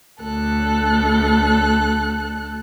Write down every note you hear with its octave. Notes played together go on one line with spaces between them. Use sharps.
D2 A4 F#6